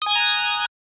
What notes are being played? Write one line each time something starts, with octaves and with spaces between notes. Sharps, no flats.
G#5 A#5 D#6 F#6 G#6